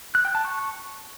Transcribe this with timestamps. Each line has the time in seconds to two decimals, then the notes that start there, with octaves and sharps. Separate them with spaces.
0.15 F#6
0.25 G5
0.35 A5
0.45 C#6